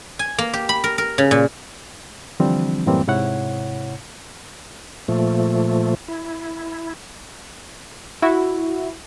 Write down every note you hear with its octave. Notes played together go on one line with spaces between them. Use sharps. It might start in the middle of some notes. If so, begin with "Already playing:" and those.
G#5
A#3
G4
B5
A#4
A#4
C#3
A#2
D3 E3 F3 G3 C4 D4
F#2 A2 E3 G3 A#3 C4
G#2 C3 E4 C#5 F#5
A#2 F3 A3
E4
E4 F#4